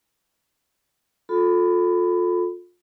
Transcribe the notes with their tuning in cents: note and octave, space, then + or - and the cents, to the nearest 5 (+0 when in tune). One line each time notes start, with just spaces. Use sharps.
F4 +30 A4 +0 B5 +20